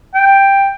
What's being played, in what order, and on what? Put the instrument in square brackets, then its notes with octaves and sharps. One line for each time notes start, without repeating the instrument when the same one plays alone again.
[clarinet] G5